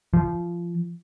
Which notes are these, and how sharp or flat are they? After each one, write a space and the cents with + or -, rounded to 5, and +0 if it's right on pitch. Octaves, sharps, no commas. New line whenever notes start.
F3 -20